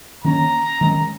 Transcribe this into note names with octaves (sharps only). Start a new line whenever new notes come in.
D#3 A#3 C#4 A#5
D#3 G#3 C#4